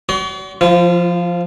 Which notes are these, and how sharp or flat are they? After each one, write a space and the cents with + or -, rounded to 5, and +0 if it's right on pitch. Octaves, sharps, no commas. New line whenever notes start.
F#4 +35 D5 -45 C6 +0
F3 +0 F4 -40